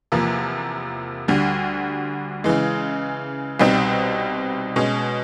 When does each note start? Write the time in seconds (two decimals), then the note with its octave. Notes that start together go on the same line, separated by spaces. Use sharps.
0.12 E2 C3 F3 A#3
1.28 D2 D3 G3
2.44 C#3 E3 G#3
3.59 C2 B2 G3 C4 D#4
4.76 B2 G#3 C#4